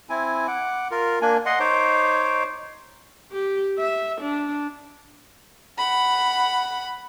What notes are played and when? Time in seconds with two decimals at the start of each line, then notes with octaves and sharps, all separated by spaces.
0.09 C4 E4 G#5
0.47 F#5 D6
0.91 F4 A#4
1.21 A#3 D4 G#5
1.46 D#5 F#5 C6
1.60 D#4 C5 C#5 D6
3.32 G4
3.78 E5
4.21 D4
5.78 F#5 B5